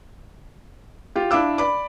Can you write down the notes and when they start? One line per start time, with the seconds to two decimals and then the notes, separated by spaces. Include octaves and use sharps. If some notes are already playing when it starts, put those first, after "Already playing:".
1.15 F4 G4
1.31 D4 E4 F5 D6 E6
1.58 D5 B5 D6